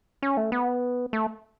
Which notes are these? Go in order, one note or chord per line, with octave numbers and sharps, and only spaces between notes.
C#4
A3
B3
A3